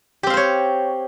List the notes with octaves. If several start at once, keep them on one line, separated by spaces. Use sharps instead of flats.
C4 G4 C5 C#5 F5